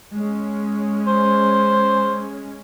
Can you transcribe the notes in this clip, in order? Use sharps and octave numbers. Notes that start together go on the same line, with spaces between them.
G#3 C#4
C5